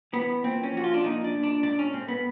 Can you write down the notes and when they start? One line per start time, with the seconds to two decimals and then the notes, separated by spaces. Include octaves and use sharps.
0.13 E3 B3
0.43 A#2 C4
0.63 C#4
0.73 F3 F#4
0.84 F4
0.94 D4
1.03 A#2 D#4
1.24 D4
1.34 A#2
1.43 D4
1.63 A2 D4
1.79 C#4
1.93 A2 C4
2.08 B3